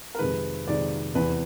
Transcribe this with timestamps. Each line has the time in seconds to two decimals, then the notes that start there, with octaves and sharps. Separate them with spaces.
0.15 A#4
0.19 F2 C3 D#3 G#3 B4
0.66 F2 C3 D#3 G#3 D5
1.14 E2 C3 E3 B4